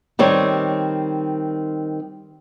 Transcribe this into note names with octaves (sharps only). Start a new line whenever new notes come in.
D#3 G3 C4 C#5